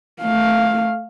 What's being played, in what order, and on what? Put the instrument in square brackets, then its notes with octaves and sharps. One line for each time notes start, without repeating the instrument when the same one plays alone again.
[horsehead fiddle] A3 F5